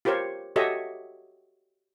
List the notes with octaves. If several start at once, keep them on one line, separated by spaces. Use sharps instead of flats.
F4 G4 A#4 C5 C#5
F#4 G4 A4 C#5 D#5 E5